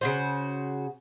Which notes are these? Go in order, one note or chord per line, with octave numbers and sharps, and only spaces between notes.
C#3 F#4 C5